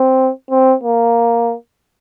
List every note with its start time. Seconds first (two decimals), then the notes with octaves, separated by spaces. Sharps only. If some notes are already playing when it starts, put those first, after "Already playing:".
Already playing: C4
0.50 C4
0.84 A#3